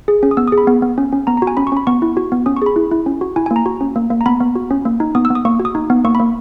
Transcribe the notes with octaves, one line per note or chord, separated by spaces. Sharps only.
G#4
C#4
D#6
B3 E6
G#4 D#6
B5
B3
B3
C#4
C#4
B3 A#5
F#4 A#5
G#5
C#4 B5
C#6
C#4 B5
B3 C#6
E4
F#4
B3
C#4 D#6
C#6
G#4 B5
E4
E4
C#4
F#4
E4 G#5
A#3 G#5
A#5
F#4
C#4
A#3
A#3
A#5
B3 B5
B3
F#4
C#4
A#3
D#4
B3 D#6
E6
B3
D#6
A#3 C#6
F#4
D#6
D#4
B3
A#3 C#6
A#3 B5